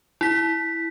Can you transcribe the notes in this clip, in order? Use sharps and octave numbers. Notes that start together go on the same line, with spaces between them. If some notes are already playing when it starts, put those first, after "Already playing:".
E4 B6